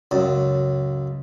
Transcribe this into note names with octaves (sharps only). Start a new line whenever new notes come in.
C#2 F#2